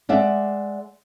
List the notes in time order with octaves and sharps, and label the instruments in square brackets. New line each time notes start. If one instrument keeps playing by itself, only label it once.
[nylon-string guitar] G#3 D5 E5 F#5